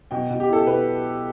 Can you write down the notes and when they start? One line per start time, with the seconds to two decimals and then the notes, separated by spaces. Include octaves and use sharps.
0.11 B2 G5
0.30 B2
0.40 G4
0.48 E4 A4
0.67 B2 B4